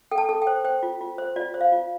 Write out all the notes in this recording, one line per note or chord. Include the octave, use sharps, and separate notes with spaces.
A4 G5
A5
A4
G5
C5
C5 G5
F4
F4
C5
F4 D5
C5
F5
F4